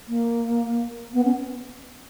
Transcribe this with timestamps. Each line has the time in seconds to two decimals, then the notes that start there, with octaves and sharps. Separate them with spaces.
0.08 A#3
1.13 B3
1.24 C#4